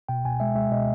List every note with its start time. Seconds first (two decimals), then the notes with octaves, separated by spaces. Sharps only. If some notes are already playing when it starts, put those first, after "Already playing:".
0.09 B2 G5
0.25 B2 G#5
0.40 G#3 E5
0.55 G#3 E5
0.71 B2 D#5